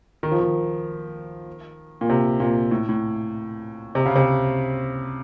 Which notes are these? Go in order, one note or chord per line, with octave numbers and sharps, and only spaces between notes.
D#3
F3
D#3
A#2
C3
A#2
A2
A2
C3
C#3
C3